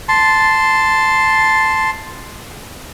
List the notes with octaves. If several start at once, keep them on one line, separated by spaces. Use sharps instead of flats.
A5 C6